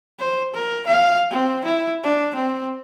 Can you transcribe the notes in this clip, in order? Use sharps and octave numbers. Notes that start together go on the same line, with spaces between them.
C5
A#4
F5
C4
E4
D4
C4